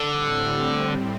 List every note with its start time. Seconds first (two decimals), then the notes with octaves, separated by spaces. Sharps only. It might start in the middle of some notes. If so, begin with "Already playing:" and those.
Already playing: D3
0.10 A2 G3 C4